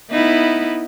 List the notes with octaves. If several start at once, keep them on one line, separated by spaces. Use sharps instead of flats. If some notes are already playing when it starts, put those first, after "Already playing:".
B3 D#4 E4